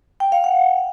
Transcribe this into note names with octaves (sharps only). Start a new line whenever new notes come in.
G5
F5
F#5